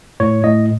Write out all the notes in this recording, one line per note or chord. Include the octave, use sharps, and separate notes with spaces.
A2 C#5
A2 D#5